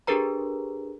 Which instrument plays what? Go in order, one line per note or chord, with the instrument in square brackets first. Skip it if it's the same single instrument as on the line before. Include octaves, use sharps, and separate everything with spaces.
[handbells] D4 G4 G#4 A#4 B4 A#5